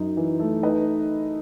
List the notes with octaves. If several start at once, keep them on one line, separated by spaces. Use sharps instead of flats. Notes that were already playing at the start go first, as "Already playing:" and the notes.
Already playing: F#2 D#4
E3
A3
D#4 B4 D#5